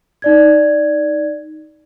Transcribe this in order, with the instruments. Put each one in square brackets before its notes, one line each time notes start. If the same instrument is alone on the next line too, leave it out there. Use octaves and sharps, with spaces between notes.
[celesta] D#4 D5 G#6